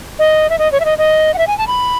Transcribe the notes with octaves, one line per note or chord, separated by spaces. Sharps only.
D#5
E5
D#5
C#5
E5
D#5
D#5
F#5
E5
G#5
A5
B5